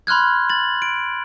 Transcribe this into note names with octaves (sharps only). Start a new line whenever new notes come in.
B5 C6 F6 F#6 G#6
A6 F#7
D7